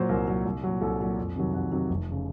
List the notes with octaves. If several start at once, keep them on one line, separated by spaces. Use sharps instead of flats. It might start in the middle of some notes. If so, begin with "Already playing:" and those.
Already playing: A#2 F#3 C5
C2 A#4
A#2 F#3
C2
A#2 F#3
C2 A4
A#2 F#3
F2
C3 D#3 F#3
F2 F#5
C3 D#3 F#3
F1
C#3